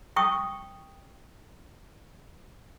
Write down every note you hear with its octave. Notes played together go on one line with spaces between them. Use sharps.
G5 C#6 D#6